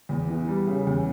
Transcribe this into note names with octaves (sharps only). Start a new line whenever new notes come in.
E2
E3
G3
C#3
E2